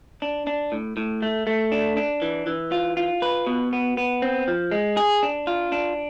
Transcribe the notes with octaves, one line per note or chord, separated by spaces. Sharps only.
D4
D4
A2
A2
A3
A3
D4
D4
E3
E3
F4
F4
B4
B2
B3
B3
C4
F3
G#3
G#4
D4
F4
D4